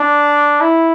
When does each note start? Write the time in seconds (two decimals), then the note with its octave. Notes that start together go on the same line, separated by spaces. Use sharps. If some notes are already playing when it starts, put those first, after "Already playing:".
Already playing: D4
0.61 E4